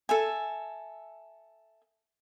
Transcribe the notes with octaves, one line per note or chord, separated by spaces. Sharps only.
A4 E5 G#5